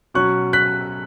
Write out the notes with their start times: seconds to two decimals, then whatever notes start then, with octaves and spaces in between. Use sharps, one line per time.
0.14 B2 F#3 C#4 C#6 F#6
0.53 F#6 B6